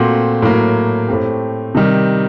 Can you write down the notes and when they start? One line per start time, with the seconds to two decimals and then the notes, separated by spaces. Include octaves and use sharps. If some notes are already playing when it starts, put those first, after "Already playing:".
Already playing: A#2 A3 C4 F#4 C5
0.42 A2 F#3 A#3
1.09 A2 A3 C4 G4
1.75 C3 D#3 G3